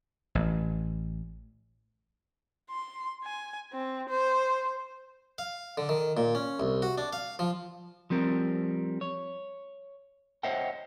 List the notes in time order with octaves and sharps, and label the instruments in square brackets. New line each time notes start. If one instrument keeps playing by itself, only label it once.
[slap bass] A1
[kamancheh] C6
G#5
C4
C5
[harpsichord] F5
D3
D#3
A#2
C#4
C2
F#4
D4
F5
F3
[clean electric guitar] F3 G3 C4 A#4
C#5
C5 C#5 D#5 E5 F#5 G5